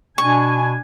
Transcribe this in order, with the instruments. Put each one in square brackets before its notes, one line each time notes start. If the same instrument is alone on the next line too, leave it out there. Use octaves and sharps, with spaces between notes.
[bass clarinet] B2 [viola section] D4 G#5 [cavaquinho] C#6